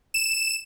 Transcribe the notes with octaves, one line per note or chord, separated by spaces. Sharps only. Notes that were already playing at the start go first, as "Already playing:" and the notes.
E7